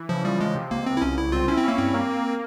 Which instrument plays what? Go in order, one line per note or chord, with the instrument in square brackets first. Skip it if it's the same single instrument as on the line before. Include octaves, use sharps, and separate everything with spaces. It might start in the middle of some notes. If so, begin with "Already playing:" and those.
Already playing: [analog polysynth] E3
[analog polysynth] C#3 [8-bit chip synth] F3
[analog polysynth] F3 [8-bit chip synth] G3
[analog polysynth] F3 [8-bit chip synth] G#3
[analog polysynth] C3
[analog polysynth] C#2 [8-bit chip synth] A#3
[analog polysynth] C#2 [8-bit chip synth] C4
[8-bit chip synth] E4
[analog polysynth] C2 [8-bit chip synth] C#4
[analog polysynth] C2 [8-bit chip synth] E4
[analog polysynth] C4 [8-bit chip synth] F4
[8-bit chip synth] C#4 [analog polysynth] E4
[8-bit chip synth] C4
[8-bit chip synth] A#3 [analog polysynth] C#4
[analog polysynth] G2 [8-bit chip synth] C4
[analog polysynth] A#3
A#3